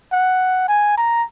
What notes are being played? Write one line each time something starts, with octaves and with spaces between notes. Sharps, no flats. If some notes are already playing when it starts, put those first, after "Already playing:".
F#5
G#5
A#5